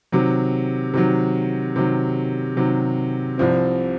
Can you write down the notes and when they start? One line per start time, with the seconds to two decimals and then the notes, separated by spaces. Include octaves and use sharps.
0.12 C3 D#3 F#3
0.94 C3 D#3 F#3
1.76 C3 D#3 F#3
2.57 C3 D#3 F#3
3.38 C2 C3 F3 C4